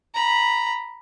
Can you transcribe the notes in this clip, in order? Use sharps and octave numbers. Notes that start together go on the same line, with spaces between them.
A#5 B5